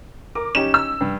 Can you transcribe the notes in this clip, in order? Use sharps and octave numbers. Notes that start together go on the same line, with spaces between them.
A#4 D6
C#4 D#4 G4 E7
E6
G2